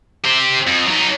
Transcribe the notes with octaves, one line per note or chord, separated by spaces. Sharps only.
G4 C5
F2
F#3 D#4